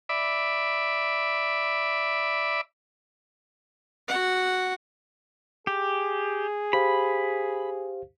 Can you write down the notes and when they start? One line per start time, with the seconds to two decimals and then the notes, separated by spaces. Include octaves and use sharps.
0.09 D5 E5 B5
4.08 F#4 F#5
5.67 G4 G#4
6.73 G4 C5 F5 B5